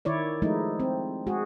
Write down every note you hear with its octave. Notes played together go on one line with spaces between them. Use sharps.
D#3 E4 C#5 D5
F3 G#3 A3 D#4 E4
C4
G#3 F#4 G#4